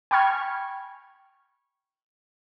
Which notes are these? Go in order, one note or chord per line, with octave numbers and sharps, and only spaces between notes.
G5 G#5 B5 C#6 F6 G#6